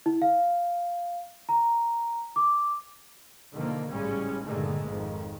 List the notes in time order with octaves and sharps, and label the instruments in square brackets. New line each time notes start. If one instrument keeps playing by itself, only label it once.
[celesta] E4
F5
A#5
D6
[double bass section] B2 D3 D#3 F3 A#3
A1 G#2 C#3 G3 G#3 C#4
G2 A#2 D3 D#3 G#3 A3
G#1 F2 G#2 D#3